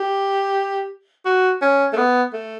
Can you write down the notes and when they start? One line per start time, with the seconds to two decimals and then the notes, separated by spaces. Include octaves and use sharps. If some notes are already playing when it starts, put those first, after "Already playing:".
Already playing: G4
1.25 F#4
1.62 C#4
1.93 A3
1.97 B3
2.33 A3